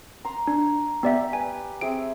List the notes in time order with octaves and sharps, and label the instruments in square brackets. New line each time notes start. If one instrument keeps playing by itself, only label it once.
[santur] A#5 C6
[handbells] D4
[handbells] B3 D5 E5 [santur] G4
[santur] B4 [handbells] G#5
[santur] C4 G#4 E5 [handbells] D7